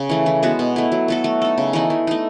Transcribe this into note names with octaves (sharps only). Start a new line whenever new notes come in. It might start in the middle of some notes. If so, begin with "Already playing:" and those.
Already playing: C#3
E3 A3
E3
G#3 B3 F#4
B2
A3 E4
F#3
B3 F#4 A4
A3
D#4 A4
C#3
E3 A3 D#4
E3
A3 D#4